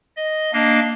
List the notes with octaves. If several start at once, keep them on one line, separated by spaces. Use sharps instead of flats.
D#5
A#3 D4 D#5 F5